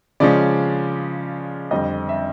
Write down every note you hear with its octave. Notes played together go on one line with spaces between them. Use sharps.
C#3 F3 G#3 C#4 D5
F2 D3 G3 C4 D#5
E5